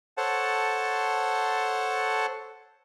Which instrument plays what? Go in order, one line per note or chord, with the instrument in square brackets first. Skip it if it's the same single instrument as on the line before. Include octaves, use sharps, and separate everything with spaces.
[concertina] A4 C5 C#5 F#5 A5